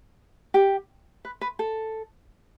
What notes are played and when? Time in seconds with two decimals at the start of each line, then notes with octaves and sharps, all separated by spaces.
0.54 G4
1.25 B4
1.41 B4
1.59 A4